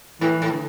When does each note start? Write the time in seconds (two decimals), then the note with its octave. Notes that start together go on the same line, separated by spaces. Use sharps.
0.21 A2 E3
0.42 A2
0.52 D3